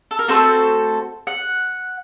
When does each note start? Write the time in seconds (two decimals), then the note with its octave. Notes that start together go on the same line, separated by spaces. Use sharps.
0.11 A4
0.19 A#4
0.28 A3 C4 F#4 A4 C5
1.27 F#5